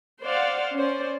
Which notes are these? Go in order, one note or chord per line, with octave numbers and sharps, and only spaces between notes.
C5 D5 F5 F#5
C#4 C5 D5